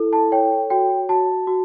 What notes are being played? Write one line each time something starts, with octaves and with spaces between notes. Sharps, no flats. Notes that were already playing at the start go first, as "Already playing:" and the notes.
Already playing: E4 A4
A5
C#5 G5
F#4 G5
F#4 A5
F#4